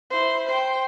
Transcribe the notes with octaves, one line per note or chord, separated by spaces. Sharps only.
E4 C5
C5 G5